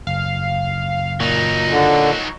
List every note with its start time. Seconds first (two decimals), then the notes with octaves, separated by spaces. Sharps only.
0.07 F#1 F5
1.20 A#2 F#3 D#4
1.70 D3